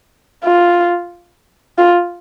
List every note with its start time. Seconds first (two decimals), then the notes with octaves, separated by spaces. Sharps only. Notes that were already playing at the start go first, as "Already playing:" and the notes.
0.45 F4
1.78 F4